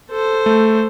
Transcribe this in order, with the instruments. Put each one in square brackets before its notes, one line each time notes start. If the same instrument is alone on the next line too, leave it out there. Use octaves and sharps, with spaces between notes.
[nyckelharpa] A4 C5
[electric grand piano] A3